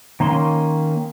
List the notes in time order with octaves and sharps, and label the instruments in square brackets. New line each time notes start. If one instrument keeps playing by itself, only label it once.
[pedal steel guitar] D#3 A#3 C#4 C6